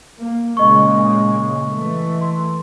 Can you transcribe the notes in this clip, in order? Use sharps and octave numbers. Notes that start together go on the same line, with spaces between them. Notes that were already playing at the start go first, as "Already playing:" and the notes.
A#3
A#2 C#3 G#3 D#5 C#6
E3 A3
C6